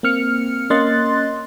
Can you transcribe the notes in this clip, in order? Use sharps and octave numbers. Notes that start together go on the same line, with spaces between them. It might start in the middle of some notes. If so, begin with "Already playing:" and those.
A#3 C4 F6 C#7
A#3 C#4 D#5 C6 F#6 A6